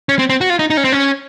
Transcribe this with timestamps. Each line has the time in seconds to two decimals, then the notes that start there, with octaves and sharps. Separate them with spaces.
0.09 C#4
0.19 C4
0.30 C4
0.41 F#4
0.50 F4
0.59 D#4
0.70 D#4
0.77 C#4
0.84 C4
0.92 C#4